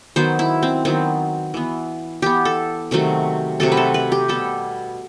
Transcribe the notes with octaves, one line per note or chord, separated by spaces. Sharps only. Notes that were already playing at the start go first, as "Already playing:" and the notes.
D#3 F#3 B3 C5
E4
C4
D#3 F#3 B3 C4
E3 B3
E3 B3 G4
A4
C3 D#3 F#3 A3
C3 D#3 F#3 A3 A4
B4
A4
B4
G4
B2 G3 B3 A4